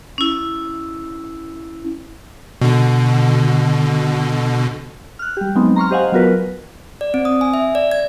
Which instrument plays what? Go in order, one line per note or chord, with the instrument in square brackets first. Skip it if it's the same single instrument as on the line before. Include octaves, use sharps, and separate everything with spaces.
[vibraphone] C#4 E4
[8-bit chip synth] B2 D3
[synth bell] F6 F#6
G3 G4
F#3 G#3 B3 C4 D#4
A#5 C6 C#6 F6
G4 C5 D#5 F5 F#5 G#5
F#3 B3 F4 F#4 A#4 B4
[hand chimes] D5
C4
D#6
G#5
E5
D5
G#6